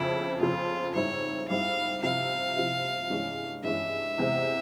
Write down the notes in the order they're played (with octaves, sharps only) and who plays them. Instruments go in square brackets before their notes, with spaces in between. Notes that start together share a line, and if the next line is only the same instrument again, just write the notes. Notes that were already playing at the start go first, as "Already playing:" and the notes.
Already playing: [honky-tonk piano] F2 C#3 F3 C4 [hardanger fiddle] E4
[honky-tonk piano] F2 C#3 F3 C4 [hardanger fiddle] F4
[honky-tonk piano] G#2 G3 C4 E4 [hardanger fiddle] C#5
[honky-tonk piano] G#2 G3 C4 E4 [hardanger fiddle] F5
[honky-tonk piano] C3 F3 C4 E4 [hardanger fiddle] F5
[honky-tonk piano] C3 F3 C4 E4
G2 E3 G#3 C#4
[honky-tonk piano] G2 E3 G#3 C#4 [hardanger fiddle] E5
[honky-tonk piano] E2 C3 E3 G#3 C4